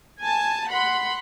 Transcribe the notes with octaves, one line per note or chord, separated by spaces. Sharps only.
G#5 A5
F#5 B5 C6